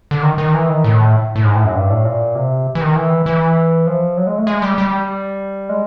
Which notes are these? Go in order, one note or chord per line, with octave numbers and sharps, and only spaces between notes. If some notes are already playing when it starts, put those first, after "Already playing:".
D3
D#3
D#3
E3
D#3
A2
A2
G#2
A2
F#2
G2
A2
A#2
C3
E3
D#3
E3
E3
F3
F#3
G#3
A3
G#3
G3
G3
G#3